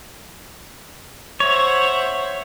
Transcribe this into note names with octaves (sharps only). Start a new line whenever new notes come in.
C5 C#5 E5 F#5